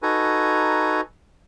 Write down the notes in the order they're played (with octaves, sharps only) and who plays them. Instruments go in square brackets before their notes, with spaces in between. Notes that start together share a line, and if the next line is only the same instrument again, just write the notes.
[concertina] D#4 F#4 A4 B4 G#5 A#5